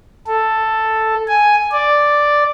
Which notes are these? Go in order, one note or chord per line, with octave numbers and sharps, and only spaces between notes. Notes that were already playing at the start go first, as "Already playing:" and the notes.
A4
G#5
D5